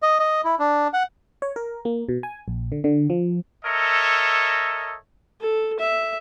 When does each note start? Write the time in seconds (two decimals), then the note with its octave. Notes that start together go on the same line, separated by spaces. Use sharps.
0.02 D#5
0.20 D#5
0.44 E4
0.59 D4
0.93 F#5
1.42 C#5
1.56 A#4
1.85 A#3
2.09 B2
2.23 G#5
2.48 A#1
2.72 D3
2.84 D3
3.10 F3
3.65 A4 A#4 C#5 D#5 E5
5.40 A4
5.79 E5